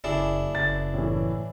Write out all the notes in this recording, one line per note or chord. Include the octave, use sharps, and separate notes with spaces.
F#1 D4 E4 G#4
F#1 A6
A2 E3